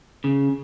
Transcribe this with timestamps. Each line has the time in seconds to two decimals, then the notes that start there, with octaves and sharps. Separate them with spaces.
0.24 C#3